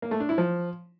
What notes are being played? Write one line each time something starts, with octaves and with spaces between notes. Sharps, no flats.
A#3
A3
D4
E4
F3